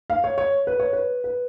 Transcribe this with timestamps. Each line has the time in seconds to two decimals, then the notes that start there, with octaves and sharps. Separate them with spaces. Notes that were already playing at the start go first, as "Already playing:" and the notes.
0.10 F5
0.24 C#5
0.38 C#5
0.67 B4
0.80 C#5
0.93 B4
1.24 B4